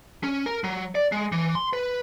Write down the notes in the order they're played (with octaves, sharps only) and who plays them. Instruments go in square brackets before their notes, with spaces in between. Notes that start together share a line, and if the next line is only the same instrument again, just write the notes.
[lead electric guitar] C#4
A#4
F#3
D5
G#3
E3
C6
B4